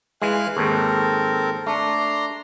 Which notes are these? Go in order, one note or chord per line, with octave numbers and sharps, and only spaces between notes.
E3 G#3 F5 G#5 F#6
D#2 G#2 C4 A4 A#4
A3 D4 A#5 C6